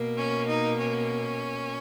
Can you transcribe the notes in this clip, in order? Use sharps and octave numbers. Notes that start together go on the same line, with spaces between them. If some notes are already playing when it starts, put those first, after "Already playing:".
Already playing: B2 A#3
C#4
D#4
C#4